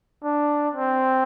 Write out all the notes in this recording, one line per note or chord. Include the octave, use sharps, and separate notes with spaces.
D4
C4